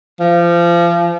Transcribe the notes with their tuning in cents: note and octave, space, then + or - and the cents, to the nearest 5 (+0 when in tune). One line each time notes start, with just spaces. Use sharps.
F3 -30